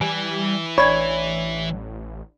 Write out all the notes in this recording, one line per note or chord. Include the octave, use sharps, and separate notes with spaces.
E3 G3 G#5
A1 D4 C#5 D5 B5